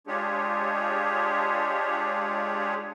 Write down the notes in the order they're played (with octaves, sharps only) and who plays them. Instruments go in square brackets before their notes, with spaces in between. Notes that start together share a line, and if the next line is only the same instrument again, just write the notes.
[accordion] G#3 D4 F4 G4 G#4 C#5